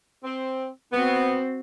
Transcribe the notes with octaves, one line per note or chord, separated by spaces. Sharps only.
C4
B3 C4 F#4